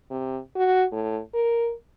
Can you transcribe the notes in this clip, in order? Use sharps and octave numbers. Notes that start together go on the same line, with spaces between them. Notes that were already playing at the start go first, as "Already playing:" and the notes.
C3
F#4
A2
A#4